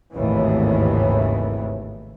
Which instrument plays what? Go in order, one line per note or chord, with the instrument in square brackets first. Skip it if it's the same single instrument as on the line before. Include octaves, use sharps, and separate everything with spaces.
[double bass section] G#1 D#2 A2 C#3 E3